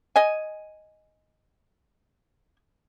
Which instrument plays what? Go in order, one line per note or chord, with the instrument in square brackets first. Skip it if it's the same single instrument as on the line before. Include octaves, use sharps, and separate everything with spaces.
[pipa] D#5 G#5